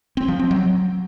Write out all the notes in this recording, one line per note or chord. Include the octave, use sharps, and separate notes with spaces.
C4
F3
C4
F#3